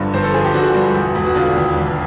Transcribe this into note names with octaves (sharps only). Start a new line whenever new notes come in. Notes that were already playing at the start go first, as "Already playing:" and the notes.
Already playing: G1 G2 D3 F3
G1 C5
A4
F3 G#4
G4
D3 F#4
G2
E1
E1
F#4
D3 F4
D#2
E1